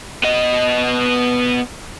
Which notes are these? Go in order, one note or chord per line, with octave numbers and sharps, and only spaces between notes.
B3 D#5